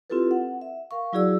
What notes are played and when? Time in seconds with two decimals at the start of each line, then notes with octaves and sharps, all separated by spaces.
0.10 C4 E4 F4 G4 A4 B4
0.31 F#5
0.61 E5
0.91 A#4 F5 C#6
1.13 F#3 E4 F#4 G#4 D5 E6